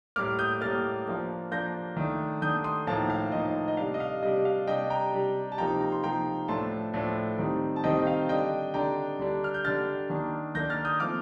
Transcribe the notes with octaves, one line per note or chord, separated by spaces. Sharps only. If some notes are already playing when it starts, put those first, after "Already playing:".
A2 G3 A#3 D6 F6
D#6 G6
A2 G3 A#3 F6 A6
F3 A#3 D4
F3 A#3 D4 G6 A#6
D#3 A3 D4
D#3 A3 D4 D#6 G6
C6 D#6
A2 F3 A#3 D#4 F5 A5
F5
A2 F3 A#3 D#4 D#5
D#5
C3 G3 D4 F5
D#5
F5
C3 G3 D4 D#5
F5
C3 G3 D4 D#5 G5
G5 A#5
C3 G3 D4
A5
C3 F3 A#3 D#4 G5 A#5
A#5
C6
C3 F3 A#3 D#4 G5 A#5
A2 F3 A3 D4 A5 C6
A2 F3 A3 D4
D#3 G3 C4 D#4
A5
D#3 G3 C4 D#4 D#5 G5
F5
D3 G3 D4 D#5 G5
D3 G3 D4 G5 A#5
D3 G3 D4
F6
G6
D3 G3 D4 F6 A6
D#3 A#3 D4
D#3 A#3 D4 G6 A#6
F6 A6
D#6 G6
F3 A3 C4 D6 F6